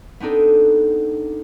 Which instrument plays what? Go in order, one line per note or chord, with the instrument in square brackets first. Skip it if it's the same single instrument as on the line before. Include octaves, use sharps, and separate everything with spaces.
[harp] B3 C4 D4 D#4 A4